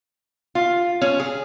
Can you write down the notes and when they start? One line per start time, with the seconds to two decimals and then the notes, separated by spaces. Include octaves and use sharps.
0.55 F4
1.01 C#4
1.20 G#4